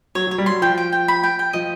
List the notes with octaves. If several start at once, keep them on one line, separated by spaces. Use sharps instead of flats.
F#3 C#5
F#3
C#5
G3
F#3 C6
F3 G5
G5
G5
B5
G5
G5
F3 D#5